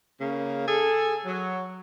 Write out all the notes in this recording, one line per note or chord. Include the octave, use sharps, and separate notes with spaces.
C#3 A#3
G#4 A4
F#3